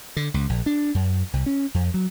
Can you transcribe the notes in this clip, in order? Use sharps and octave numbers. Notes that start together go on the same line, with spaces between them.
D3
C#2
A#1
D4
F#2
C2
C#4
F2
F#3